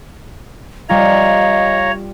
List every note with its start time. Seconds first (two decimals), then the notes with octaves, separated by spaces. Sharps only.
0.89 G3 F4 C#5 D#5 F5 A#5